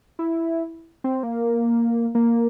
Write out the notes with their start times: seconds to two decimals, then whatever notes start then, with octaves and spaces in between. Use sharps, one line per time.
0.19 E4
1.04 C4
1.23 A#3
2.15 A#3